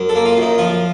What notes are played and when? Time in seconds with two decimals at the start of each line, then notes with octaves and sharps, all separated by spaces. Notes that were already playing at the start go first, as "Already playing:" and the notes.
Already playing: F#2
0.09 A4
0.15 A#3
0.25 F4
0.37 F#2 D#4
0.58 F3 F4